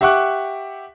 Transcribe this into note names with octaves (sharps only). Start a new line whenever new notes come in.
G4 E5 F#5 C#6 D6 F#6